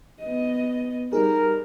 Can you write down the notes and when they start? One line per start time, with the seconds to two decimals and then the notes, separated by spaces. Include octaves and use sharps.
0.21 B3 D#5
1.13 G3 D#4 G#4 A#4